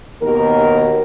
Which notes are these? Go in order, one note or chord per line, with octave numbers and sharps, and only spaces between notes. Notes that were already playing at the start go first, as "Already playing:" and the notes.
D#2 B2 A#4